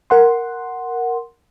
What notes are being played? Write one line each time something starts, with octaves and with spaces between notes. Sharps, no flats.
A#4 F#5 C6